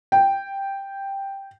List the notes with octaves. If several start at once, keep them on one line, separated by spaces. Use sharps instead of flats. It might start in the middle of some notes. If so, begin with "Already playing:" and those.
G5